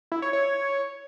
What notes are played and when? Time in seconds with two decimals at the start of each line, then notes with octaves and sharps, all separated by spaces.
0.12 E4
0.22 C#5
0.33 C#5